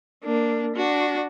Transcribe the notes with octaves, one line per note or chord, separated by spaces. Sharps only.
A#3 D4
D4 F#4